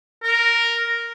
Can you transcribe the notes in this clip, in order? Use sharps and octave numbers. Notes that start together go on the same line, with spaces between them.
A#4